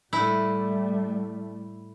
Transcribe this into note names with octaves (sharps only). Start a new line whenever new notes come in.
A2 G3 A3 E4